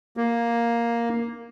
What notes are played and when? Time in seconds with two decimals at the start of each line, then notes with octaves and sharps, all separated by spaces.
0.17 A#3